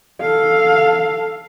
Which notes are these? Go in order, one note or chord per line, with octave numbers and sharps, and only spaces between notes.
A4 F5